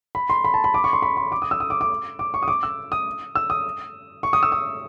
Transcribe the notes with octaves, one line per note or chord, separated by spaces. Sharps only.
B5
C6
B5
A5
B5
D6
C#6
C6
B5
C6
D6
D#6
E6
D#6
D6
D6
D6
C#6
D#6
D6
E6
D#6
E6
D#6
C#6
D#6
E6
D#6